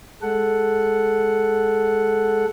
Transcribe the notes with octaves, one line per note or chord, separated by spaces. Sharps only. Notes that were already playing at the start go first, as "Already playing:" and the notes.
G#3 A4 F#5